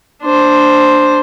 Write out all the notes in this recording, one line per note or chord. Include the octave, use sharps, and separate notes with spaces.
D4 C5